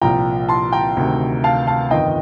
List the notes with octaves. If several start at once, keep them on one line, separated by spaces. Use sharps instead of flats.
C2 A#2 F3 G5 A#5
A5 C6
G5 A#5
D2 C3 D#3
F5 A5
F5 A5
G1 F2 D#3 D#5 G5